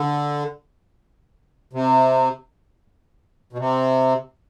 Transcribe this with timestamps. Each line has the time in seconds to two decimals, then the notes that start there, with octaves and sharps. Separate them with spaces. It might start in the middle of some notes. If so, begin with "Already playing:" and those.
Already playing: D3
1.73 C3
3.53 B2
3.58 C3